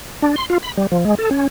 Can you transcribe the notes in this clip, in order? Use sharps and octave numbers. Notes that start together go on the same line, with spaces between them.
D4
C6
F4
B5
G3
F3
G#3
A4
C#4